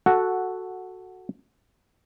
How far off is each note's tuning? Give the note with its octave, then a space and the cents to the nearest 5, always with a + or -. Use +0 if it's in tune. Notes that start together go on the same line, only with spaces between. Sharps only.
F#4 +0 A4 +0 F#5 -5